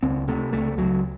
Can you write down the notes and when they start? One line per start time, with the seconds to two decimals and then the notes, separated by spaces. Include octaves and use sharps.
0.03 C#2 C4
0.28 C3 A3
0.53 C#2 A3
0.77 C#2 F#3